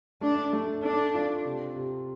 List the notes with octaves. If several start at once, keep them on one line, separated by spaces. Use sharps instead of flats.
A3 D4
A3
D4 A4
F4
C3
C3